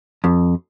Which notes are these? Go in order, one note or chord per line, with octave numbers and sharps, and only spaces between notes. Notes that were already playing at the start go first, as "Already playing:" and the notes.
F2